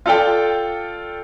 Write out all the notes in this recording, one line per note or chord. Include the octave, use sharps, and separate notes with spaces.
F4 A4 D5 G5